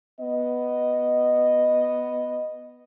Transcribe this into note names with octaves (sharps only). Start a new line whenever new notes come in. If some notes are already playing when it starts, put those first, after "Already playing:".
B3 D#5